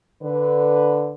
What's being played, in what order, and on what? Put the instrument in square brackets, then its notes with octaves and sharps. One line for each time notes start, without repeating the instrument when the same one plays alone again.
[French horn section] D3 B4